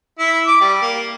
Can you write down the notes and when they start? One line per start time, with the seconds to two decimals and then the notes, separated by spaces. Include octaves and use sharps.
0.19 E4
0.47 D6
0.60 G3
0.81 A#3